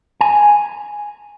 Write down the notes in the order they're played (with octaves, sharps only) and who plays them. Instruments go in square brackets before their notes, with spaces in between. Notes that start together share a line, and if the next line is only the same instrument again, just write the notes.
[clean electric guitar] G#5